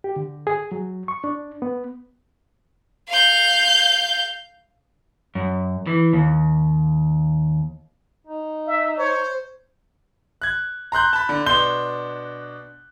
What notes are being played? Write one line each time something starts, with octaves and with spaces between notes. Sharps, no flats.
G4
D3
G#4
F#3
C#6
D4
B3
F5 G6
F#2
E3
D#2
D#4
E5
C5 C#5
F#6 G#6
A#5 C6 F#6 G6
A5 B5
D3
B2 D4 C6 G6 G7